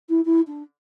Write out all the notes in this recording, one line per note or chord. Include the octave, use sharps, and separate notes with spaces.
E4
E4
D4